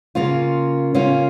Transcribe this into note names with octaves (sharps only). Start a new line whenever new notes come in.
C#3 A#3 C#4 F4
C#3 A#3 C#4 F4